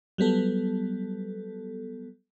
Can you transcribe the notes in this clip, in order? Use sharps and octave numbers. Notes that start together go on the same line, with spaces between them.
F#3 G3 B3 A4